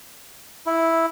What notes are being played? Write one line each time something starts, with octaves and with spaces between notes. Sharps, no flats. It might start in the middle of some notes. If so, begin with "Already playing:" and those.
E4